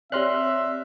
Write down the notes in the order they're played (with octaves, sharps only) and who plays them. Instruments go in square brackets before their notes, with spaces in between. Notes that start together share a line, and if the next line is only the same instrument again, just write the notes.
[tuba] C4 [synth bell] G4 C#5 D5 [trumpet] E5 [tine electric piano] C6 F6 F#6